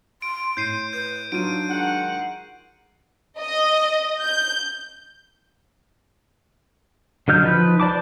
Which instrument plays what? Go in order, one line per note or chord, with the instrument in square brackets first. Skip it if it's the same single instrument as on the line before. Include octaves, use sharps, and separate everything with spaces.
[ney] C6 [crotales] D7
[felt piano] A2 [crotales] G6 C7 D#7
[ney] B4 [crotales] G6
[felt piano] F#3 D#4 F4 [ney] D4 [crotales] D7 D#7
[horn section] D#3 G#3 F#5
[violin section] D#5
G6
[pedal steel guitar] D3 F#3 D#5 F6 G6
F3 D#4 B4
C5 D5 A5 D6